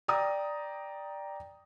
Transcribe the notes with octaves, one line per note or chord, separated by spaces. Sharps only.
D5 G5 A#5 D#6